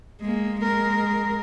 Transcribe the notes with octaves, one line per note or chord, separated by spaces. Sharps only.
G#3 A#3
G#3 A#4